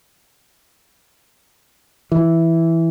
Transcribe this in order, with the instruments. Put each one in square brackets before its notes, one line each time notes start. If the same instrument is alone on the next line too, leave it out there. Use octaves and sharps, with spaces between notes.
[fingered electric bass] E3